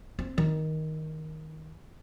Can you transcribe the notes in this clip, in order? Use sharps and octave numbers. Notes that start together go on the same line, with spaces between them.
C4
D#3